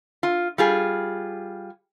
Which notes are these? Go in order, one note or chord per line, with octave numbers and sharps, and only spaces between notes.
F4
G3 F4 G#4